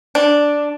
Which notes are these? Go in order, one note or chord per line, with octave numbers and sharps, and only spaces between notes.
D4